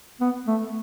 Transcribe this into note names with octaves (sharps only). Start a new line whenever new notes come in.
B3
A3